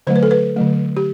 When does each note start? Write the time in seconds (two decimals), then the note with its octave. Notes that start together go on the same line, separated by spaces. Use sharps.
0.07 D3 F#3 A3 C5
0.16 B4
0.23 A4
0.31 B4
0.56 D3 F#3 A3
0.97 G4